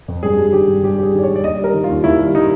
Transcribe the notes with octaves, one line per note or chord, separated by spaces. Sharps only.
F2
G2 G#4
G3
D#3 G4
G2
G2 G4
G3 G4 G#4
D#3
D5
C#5
G2
D5
D#2 D#5
G3
A#4
D#3
F4
D#2
D#2 E4
G3
D#3 D#4